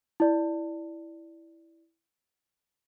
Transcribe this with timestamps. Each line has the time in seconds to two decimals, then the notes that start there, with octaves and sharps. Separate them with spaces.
0.20 E4 D5